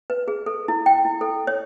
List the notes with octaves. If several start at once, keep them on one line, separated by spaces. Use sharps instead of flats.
B4
G#4
A4
E4
G5
E4
A4
C#5